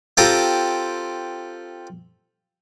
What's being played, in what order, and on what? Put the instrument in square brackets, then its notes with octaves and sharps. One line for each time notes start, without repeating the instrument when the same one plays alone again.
[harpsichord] C4 F4 G4 A4 A#5